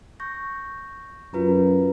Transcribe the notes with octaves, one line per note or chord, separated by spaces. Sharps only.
C#6 G6 A#6
F#2 F4 B4 A#5